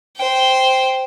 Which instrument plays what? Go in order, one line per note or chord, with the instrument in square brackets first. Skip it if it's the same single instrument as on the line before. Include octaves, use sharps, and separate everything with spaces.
[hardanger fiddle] C5 G5